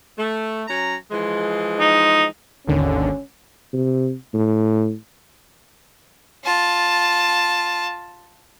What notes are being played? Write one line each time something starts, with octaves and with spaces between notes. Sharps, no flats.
A3
F#3 C#4 A#5
E3 F3 G#3
D#4
G#1 D#2 D3 C#4
C3
A2
F4 A5